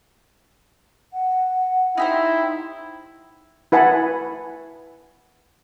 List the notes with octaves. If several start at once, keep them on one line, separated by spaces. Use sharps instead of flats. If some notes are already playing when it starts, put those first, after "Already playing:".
F#5
D#4 E4 G4 C5
E4 B4 F#5 G#5 A5 B5